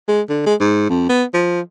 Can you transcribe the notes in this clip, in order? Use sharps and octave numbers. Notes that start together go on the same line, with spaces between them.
G#3
D3
G#3
G#2
F2
B3
F3